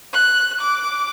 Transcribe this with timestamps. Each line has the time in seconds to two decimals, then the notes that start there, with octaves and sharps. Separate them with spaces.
0.13 F#6
0.61 D6